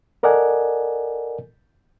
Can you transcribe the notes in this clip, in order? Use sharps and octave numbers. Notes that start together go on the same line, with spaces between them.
A4 A#4 D5 D#5 F#5 G#5